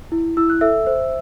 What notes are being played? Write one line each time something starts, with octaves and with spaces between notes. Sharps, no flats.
E4
E4 E6
F#6
A4 E5 E6
C5